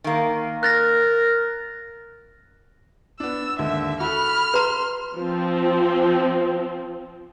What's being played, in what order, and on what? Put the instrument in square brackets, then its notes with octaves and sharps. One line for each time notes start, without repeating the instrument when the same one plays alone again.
[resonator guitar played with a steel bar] D#3 A#3
[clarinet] A#4 [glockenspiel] F#6 A6 A#6
[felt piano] B3 D4 [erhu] E6
[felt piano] D#2 G#2 D3 [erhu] E5
[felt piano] F#4 A4 [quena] B5 [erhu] F6
[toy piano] B4 A#5 [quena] C6
[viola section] F3 C4